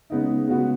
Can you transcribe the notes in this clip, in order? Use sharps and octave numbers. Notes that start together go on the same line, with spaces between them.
C#3 G#3 B3 D#4
C#3 G#3 B3 F#4